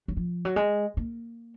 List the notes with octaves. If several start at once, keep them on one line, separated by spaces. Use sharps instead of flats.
F#3
F3
F#3
G#3
A#3